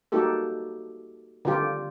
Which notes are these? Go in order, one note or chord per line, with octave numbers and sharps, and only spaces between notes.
A#3 D#4 F#4 G4 A4
D3 D#3 F4 G4